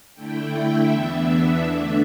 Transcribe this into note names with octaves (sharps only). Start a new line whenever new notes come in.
D3 A3 E4 G5
E5
E2 E3 B3 D4
D3 A3 D4 E5